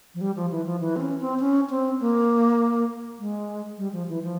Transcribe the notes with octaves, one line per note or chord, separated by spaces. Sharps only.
F3
G3
F3
E3
F3
E3
C4
C#4
C4
C#4
C4
A#3
G#3
G3
F3
E3
F3